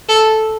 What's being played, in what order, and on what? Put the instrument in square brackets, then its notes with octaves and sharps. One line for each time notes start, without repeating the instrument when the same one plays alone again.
[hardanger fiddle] A4